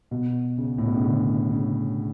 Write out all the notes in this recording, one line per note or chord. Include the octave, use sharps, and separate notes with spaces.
B2
C#3
A2
B2
C#3
D3
C#3